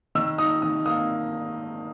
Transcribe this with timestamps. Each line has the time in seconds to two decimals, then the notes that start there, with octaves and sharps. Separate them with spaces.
0.15 D#3 E6
0.38 D#4 D#6
0.62 D#3 D#6
0.86 A#3 D#6